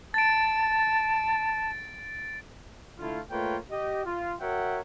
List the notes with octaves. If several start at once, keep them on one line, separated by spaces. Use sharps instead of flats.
A5 A6 D7
D3 A3 E4 F4
A3 A#3 F4 B4 C#5 G5
G4 D#5
F4
F#4 A#4 C#5 E5 F#5 G5